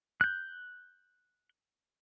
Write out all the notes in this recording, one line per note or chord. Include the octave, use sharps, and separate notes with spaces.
F#6 G6